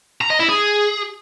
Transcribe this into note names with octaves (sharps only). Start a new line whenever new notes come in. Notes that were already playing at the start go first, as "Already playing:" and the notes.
A#5
D#5
E4
G#4